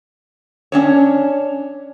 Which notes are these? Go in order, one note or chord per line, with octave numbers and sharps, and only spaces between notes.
C#4 D4 C#5